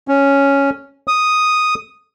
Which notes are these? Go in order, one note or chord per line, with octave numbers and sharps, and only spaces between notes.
C#4
D#6